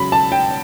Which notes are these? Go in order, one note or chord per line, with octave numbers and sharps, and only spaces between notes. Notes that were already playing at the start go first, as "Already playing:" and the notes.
Already playing: C#3 F#3 B5
A5
G5